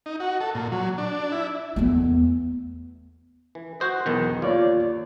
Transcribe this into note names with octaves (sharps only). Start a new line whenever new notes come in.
D#4
F#4
A4
A#2
F#3
D4
E4
E2 A3
E3
F#4 C5 D#5
B1 E2 D#3
D#2 F4 C#5 D5